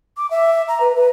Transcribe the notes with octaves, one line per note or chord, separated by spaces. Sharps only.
D6
E5
A#5
B4
B4